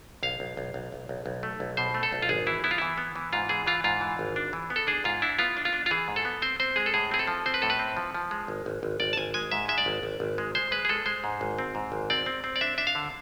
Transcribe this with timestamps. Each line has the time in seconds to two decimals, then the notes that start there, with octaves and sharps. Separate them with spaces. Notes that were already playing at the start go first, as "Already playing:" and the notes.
0.23 B1 F5
0.40 B1
0.57 B1
0.74 B1
0.92 B1
1.09 B1
1.26 B1
1.43 A3
1.60 B1
1.77 B2 C5
1.94 A3
2.03 A4
2.12 B1
2.22 F4
2.29 G#1 G#4
2.47 E3 E4
2.64 B3 E4
2.71 F4
2.78 E3 E4
2.98 B3
3.16 E3
3.33 G#2 F4
3.49 E3 G#4
3.66 E3 F4
3.84 G#2 F4
4.01 E3
4.19 G#1
4.36 D4
4.53 E3
4.70 B3
4.76 A4
4.87 D4 G#4
5.04 G#2 F4
5.22 D4 E4
5.39 B3 F4
5.57 D4
5.65 F4
5.73 D4
5.86 F4
5.91 E3 G#4
6.08 G#2
6.16 A4
6.25 B3
6.42 C4 C5
6.60 C4 C5
6.76 G#3 G#4
6.86 A4
6.94 A2 G#4
7.11 C4 G#4
7.19 A4
7.27 F3
7.46 C4 C5
7.54 B4
7.62 A2 A4
7.70 B4
7.79 C4
7.97 F3
8.14 F3
8.31 G#3
8.48 G#1
8.66 G#1
8.83 G#1
9.00 G#1 D5
9.13 A5
9.17 G#1 G#5
9.34 G#3 G#5
9.51 G#2 E5
9.68 G#3 E5
9.78 D5
9.86 G#1
10.03 G#1
10.20 G#1
10.38 G#3
10.55 G#3 C5
10.71 G#3 B4
10.85 G#4
10.89 G#3 A4
11.06 G#3 C5
11.24 G#2
11.41 G#1
11.59 C4
11.75 G#2
11.92 G#1
12.10 C4 D5
12.26 C4
12.44 C4
12.56 D5
12.61 D4 E5
12.78 D4 E5
12.87 F5
12.95 D3